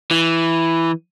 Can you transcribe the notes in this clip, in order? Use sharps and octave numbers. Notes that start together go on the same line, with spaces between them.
E3